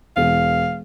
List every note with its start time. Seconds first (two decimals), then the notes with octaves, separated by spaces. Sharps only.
0.17 E1 F5